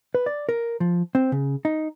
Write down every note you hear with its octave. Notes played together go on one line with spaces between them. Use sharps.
B4
D5
A#4
F3
C4
C#3
D#4